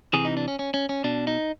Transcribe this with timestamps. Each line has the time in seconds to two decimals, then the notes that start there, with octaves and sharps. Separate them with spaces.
0.13 C3 E3 G#4
0.25 D#4
0.37 D4
0.48 C#4
0.59 C#4
0.74 C#4
0.89 C#4
1.04 B2 D4
1.27 D#4